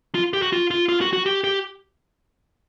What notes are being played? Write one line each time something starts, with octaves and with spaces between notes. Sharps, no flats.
F4
G4
F#4
F4
F4
F4
F#4
F#4
G4
G4